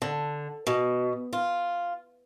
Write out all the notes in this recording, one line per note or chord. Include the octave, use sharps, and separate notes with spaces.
D3
B2
F4